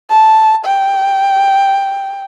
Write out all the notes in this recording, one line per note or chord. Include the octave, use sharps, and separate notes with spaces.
A5
G5